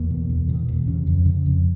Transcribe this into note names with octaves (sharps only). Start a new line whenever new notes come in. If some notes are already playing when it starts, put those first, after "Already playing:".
Already playing: E2 A#3
B2
E2
B2
E2
C#3 C#4
F2
C#3
F2